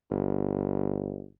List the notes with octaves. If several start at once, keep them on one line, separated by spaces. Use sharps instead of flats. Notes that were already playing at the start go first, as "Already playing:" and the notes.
G1